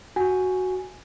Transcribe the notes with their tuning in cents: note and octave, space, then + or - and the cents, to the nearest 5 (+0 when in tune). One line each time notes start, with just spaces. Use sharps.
F#4 +0 G#5 +0